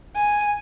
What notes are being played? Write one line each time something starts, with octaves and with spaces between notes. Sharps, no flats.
G#5